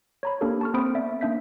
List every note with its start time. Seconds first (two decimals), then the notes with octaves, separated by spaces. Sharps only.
0.23 C#5 A#5 B5
0.41 A#3 C#4 D4 G4 A4 A#4
0.61 A5 C#6 F6
0.74 A#3 C4 C5 B5 D#6 D7
0.95 B3 D5 E5
1.21 A#3 C#4 D4 E5 G6 B6